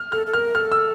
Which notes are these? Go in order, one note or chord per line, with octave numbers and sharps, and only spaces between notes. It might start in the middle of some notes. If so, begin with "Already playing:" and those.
Already playing: F6
A4 F6
A4
A#4 F6
A4 F6
E6